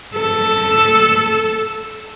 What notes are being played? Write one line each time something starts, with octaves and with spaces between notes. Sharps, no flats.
A4